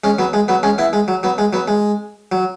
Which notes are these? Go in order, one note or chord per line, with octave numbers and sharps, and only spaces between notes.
G#3 C#4
F#3 B3
G#3
F#3 B3
G#3 C#4
B3 E4
G#3
F#3
F#3 B3
G#3
F#3 B3
G#3
F#3